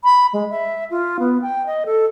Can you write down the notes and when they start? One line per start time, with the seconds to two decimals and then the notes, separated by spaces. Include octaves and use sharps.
0.04 B5
0.33 G#3
0.50 E5
0.91 F4
1.19 B3
1.42 G5
1.66 D#5
1.86 A4